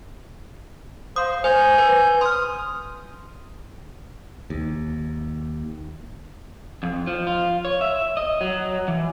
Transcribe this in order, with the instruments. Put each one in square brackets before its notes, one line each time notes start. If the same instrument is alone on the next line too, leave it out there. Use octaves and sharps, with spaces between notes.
[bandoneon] C5 [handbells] F5 D#6
[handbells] C5 [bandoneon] G#5 G6
[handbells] B4
[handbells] C6 F6 [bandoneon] D#6
[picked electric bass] D#2
[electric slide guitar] F2
F3
F4
C#5
E5
D#5
F#3
E3